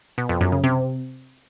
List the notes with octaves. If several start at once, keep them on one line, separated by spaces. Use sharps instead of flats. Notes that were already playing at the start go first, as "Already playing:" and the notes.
B2
F2
F#2
C#3
C3